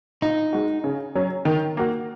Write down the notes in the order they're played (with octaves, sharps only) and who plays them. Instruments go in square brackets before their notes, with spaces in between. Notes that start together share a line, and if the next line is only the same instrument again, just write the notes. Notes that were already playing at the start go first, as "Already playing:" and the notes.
[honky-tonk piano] A#2 [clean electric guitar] D#4
[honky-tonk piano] G#3 F#4
C#3
F#3 C#4
D#3
A#3 F#4